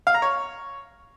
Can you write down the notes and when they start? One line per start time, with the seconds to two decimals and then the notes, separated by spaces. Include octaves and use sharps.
0.07 F5
0.14 A#5
0.22 C#5